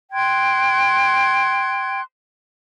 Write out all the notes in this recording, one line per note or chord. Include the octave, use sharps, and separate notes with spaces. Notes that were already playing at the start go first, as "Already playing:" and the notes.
G5 C6 F#6 G#6